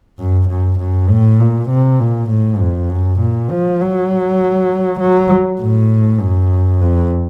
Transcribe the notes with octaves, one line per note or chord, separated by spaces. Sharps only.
F#2
F#2
F#2
A2
A#2
C3
A#2
A2
F2
F#2
A#2
F3
F#3
F#3
A2
F#2
F2